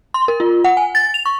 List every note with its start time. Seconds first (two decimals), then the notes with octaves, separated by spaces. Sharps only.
0.14 C6
0.28 A#4
0.40 F4
0.64 F#5
0.77 G#5
0.95 A6
1.14 F7
1.26 C#6